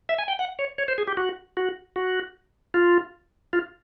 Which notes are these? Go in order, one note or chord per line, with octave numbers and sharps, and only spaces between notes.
E5
G#5
G5
F#5
C#5
C#5
C5
G#4
G4
F#4
F#4
F#4
F4
F4